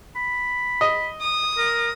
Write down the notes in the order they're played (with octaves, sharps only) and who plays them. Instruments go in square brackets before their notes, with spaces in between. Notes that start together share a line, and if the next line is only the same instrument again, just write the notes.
[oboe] B5
[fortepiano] D#5
[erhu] D#6
[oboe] A#4